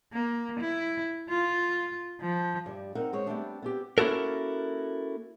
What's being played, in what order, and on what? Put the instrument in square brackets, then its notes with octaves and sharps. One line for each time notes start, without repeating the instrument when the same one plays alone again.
[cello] A#3
E4
F4
F3
[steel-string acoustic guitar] G2 G3
C4 D#4 A#4 F#5
G#2 G#3 C4 C#5
G3 A3 B3 C4 D4 G#4
B3 C4 G4
[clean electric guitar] A#3 C#4 E4 F#4 A4 A#4